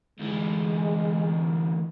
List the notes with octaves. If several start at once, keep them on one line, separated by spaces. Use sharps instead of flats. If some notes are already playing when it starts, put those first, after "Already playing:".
D2 E3 G#3